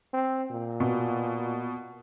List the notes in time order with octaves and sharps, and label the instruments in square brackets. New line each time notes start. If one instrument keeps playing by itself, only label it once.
[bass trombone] C4
A#2
[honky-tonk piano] B2